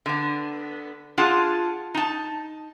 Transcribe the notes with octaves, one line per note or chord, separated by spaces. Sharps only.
D3 B3
D4 F4 G#4 F#5 A5
D#4 A5